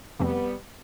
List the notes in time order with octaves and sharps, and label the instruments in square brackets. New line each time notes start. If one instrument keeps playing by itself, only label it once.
[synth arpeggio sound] F2 C3 F3 A3 C4 [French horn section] G3 B3